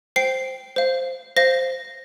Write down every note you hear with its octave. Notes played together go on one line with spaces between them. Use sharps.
C5 G5 C7
C5 F5
C5 F5 A#6